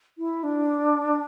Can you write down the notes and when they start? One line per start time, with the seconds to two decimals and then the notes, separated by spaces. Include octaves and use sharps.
0.18 E4
0.43 D4